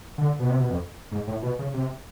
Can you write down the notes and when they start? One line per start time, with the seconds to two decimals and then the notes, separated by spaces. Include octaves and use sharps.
0.18 D3
0.40 B2
0.50 C3
0.60 B2
0.70 F2
1.12 G#2
1.27 A2
1.42 B2
1.59 C#3
1.74 C3